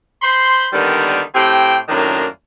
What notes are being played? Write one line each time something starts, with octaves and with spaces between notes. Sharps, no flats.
C5 B5 C6
D3 D#3 G3 A#3 B3
A2 C4 G4 G5
F#2 A2 D#3 A#3 D4